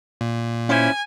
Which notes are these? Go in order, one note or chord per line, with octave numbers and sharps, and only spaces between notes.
A#2
C#4 E4 C5 G#5